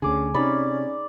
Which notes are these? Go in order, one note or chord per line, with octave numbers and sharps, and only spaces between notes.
D2 D3 C#4 G#4 D6
C3 C#4 D#4 D5 B5